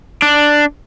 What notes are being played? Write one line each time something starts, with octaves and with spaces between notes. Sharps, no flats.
D4